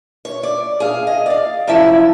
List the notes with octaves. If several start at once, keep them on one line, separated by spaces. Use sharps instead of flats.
C#5
D5
G#4 F5
D#5
D5 F5
F#2 C3 F3 E4 E5